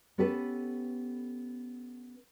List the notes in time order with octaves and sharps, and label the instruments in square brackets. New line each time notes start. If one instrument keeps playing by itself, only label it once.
[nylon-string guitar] B3 C#4 G4 A4 B4